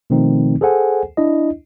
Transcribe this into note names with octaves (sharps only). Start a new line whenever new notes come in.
B2 D#3 F3 A3 C4 D#4
G#4 A4 C5 F#5 G#5
D4 E4 D#5